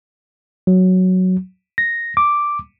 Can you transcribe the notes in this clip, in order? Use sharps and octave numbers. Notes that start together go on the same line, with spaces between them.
F#3
A#6
D6